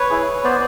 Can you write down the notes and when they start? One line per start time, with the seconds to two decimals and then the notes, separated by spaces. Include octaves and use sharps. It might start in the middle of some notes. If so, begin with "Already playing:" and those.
Already playing: B4 C#5
0.10 E4 G#4
0.44 B3 C5 D5